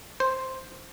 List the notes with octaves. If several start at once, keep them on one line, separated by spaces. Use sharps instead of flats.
C5